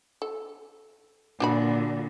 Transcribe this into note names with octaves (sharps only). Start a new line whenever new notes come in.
A4
A#2 D3 D4 F#4 B5